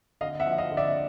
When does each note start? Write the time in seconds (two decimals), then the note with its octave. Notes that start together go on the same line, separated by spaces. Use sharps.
0.21 D3 D#5 F5
0.40 E5 F#5
0.46 F3
0.58 D#5 F5
0.71 D3
0.77 D5 E5